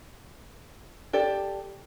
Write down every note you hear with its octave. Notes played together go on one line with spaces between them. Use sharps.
G4 A4 D5